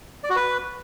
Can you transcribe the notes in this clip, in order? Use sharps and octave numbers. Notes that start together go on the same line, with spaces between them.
D5
F#4
B4